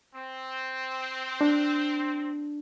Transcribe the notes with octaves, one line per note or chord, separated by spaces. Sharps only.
C4
D4